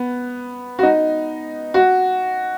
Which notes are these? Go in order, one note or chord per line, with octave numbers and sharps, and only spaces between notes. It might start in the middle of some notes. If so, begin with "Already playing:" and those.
Already playing: B3
F#4
D#4
F#4